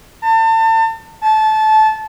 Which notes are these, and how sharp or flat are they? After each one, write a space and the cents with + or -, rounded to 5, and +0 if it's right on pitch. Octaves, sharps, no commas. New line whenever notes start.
A5 +35
A5 -20